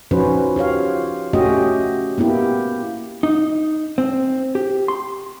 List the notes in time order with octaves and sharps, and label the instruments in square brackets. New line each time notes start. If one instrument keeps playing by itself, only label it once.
[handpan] F3 C#4 D#4 F#4 B4 C5
F4 G4 C#5 F5
A3 C#4 F#4 G4 D#5
A#3 B3 E4 G4
[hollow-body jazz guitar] D#4
C4
G4
C6